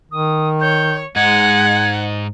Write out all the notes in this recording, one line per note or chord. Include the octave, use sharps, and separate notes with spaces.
D#3 D#6
C#5 G6
G#2 G#3 D#4 F#5 G#6